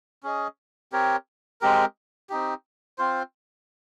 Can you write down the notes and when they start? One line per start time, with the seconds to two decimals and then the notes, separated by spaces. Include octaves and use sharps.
0.23 C#4 G#4 D#5
0.92 C4 G4 A#4 C#5
1.61 G#3 C4 G4 A#4
2.30 C4 D#4 G4
2.98 C4 F4 C5